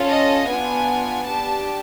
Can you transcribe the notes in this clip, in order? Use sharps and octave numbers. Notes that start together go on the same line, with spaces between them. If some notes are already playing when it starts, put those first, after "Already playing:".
Already playing: C#4 F4 A4
D#5
B3 D4 F4 G#5
D4 G4 A5